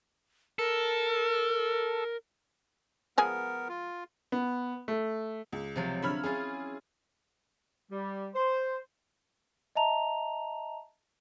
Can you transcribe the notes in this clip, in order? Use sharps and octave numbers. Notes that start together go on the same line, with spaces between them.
A4 A#4
F3 G#3 B3 G#4 A#4
F4
B3
A3
C#2
C3 F3 F#3
D3 C#5 E5 B5 F6
C#4 E4 F4 G#4
G3
C5
D#5 E5 A5 A#5 F7